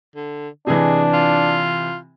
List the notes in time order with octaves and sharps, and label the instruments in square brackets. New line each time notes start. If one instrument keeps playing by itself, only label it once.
[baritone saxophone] D3
[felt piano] C3 E3 [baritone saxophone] G#3 [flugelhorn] D4
[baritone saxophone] F4